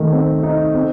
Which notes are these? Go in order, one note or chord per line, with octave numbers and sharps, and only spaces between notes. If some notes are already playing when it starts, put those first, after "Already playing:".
Already playing: D#3 A3 C4
C4
D#4
C4